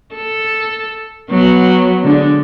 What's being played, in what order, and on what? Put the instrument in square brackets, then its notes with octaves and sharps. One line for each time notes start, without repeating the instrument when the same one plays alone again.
[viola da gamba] A4
F#3 B3
D3 G#3 D4